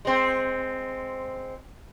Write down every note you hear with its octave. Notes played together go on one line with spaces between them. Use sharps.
G#3 C4